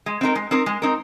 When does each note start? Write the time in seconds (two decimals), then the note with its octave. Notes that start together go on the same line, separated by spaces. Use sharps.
0.06 G#3
0.21 C4 D#4 A#4
0.35 G#3
0.51 C4 D#4 A#4
0.66 G#3
0.82 C4 D#4 A#4